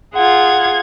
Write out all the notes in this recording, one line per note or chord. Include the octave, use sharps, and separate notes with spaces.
F4 G#4 F#5 G#6